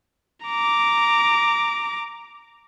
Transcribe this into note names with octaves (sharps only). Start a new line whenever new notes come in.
A#5 D6